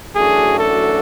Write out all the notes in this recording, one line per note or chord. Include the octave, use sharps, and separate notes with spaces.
F#2 E3 A3 D4 F#4 G#4
A4